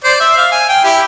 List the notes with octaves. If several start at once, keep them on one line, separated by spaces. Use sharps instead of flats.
C5 D5
E5
F5
G#5
G5
E4 G4